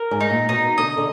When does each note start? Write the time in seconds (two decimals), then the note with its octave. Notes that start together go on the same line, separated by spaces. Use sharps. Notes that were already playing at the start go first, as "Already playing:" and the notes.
Already playing: A#4
0.11 G#2
0.21 D#4
0.30 A#2
0.49 B2 D#4
0.77 D3 D#5
0.98 D3